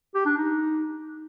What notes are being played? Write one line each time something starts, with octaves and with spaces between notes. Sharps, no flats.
G4
D4
D#4